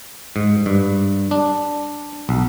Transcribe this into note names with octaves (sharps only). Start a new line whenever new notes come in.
G#2
G2
D4
B1